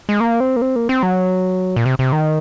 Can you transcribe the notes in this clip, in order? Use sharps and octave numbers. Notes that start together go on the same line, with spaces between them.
G#3
A#3
C4
A#3
C4
A#3
C4
F#3
A#2
C3
C3
D#3